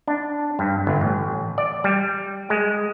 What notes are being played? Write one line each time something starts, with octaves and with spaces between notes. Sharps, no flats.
D4
G2
G1
A1
D5
G3
G#3